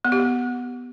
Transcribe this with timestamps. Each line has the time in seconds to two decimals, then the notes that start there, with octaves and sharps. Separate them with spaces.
0.05 B3
0.12 G4
0.20 B3